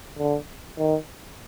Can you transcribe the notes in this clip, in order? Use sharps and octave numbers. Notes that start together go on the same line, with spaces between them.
D3
D#3